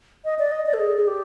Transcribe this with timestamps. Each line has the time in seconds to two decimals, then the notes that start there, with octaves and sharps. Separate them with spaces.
0.25 D#5
0.39 D5
0.51 D#5
0.66 D5
0.73 A4
0.79 G#4
0.97 G#4
1.07 G4